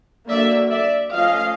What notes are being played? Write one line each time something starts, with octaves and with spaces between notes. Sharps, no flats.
D3 F#3 A#3 D5 E5
D5 E5
F3 A3 C#4 D#5 F5